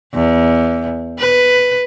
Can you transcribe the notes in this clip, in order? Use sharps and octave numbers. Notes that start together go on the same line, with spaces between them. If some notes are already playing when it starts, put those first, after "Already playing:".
E2
B4